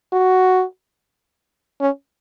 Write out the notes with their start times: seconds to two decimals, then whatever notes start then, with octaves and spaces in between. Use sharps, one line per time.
0.13 F#4
1.81 C#4